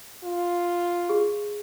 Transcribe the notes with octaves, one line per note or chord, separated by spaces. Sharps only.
F4
G4 G#4